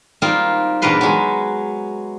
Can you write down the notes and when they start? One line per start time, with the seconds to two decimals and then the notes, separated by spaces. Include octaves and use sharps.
0.22 G3 A#3 C4 D#4 F4
0.82 E2 G2 A#2 A#4 B4 C6
1.01 F#3 G#3